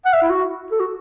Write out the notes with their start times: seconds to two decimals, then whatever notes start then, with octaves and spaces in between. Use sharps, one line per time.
0.06 F#5
0.14 E5
0.22 E4
0.30 F#4
0.72 A4
0.80 F#4